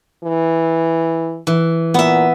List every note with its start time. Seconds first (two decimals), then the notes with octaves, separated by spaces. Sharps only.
0.24 E3
1.47 E3
1.94 A#2 B3 E5